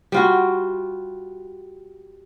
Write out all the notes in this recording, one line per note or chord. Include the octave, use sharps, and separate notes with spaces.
G3 F4 F#4